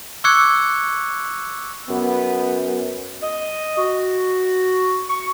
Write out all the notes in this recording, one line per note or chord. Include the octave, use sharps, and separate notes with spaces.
C#6 D6 E6 F#6 G#6 C#7
F#2 B3
D#5
F#4
C#6